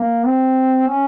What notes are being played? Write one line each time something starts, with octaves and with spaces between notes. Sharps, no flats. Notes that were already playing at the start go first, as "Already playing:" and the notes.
Already playing: A#3
C4
C#4